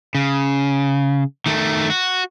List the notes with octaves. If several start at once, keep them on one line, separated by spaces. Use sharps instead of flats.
C#3
D#3 A3
F#4